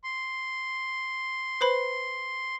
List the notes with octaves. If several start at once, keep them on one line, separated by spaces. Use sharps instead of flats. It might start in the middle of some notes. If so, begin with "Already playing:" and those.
C6
B4 C5 B5